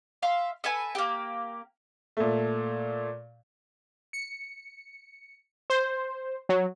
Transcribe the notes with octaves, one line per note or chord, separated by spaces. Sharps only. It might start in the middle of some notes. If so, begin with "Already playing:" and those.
E5 F5 C6
A4 B4 E5 G#5
A#3 G4
A#2 A3
C#7
C5
F#3